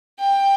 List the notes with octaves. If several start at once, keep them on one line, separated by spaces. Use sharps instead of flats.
G5